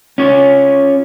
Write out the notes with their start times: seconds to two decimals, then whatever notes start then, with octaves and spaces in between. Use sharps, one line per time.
0.18 C#4 F4 C#5